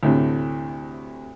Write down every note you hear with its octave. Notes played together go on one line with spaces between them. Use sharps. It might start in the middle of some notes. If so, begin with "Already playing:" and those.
D2 A2 C3